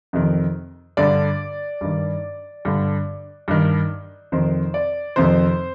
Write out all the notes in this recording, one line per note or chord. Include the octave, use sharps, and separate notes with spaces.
F2 C3 D#3
G2 D3 D5
G2 D#3
G2 D3
G2 D#3
F2 C3 D#3 C5
D5
F2 C3 D#3 C5